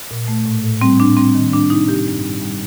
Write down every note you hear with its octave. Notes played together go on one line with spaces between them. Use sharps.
A#2
A3
A2
A2
G3 C4
A2 D4
G3 C4
D#3
G3 D4
C3 D#4
G3 G4
G2
G3
G3